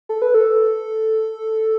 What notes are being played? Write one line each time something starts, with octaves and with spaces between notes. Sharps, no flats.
A4
B4
A4